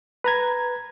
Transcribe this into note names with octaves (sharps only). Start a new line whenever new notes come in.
B4 A#5 G#6